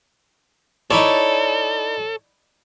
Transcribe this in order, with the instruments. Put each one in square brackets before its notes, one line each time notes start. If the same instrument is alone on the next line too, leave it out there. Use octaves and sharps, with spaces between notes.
[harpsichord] D#4 E4 D5 [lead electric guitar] A4 [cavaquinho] C#5